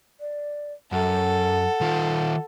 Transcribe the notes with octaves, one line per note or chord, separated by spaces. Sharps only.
D5
F#2 A4 F#5
D#3 F4